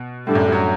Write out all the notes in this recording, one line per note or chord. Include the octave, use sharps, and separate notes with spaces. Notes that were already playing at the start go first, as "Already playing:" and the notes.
Already playing: B2
A2 D3 G3 D4 A4
F#2
F#3